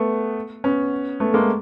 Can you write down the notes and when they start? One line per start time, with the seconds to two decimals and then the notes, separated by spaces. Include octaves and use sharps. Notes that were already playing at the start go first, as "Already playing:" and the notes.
Already playing: A3 B3
0.64 B3 C#4
1.20 A3 B3
1.34 G#3 A#3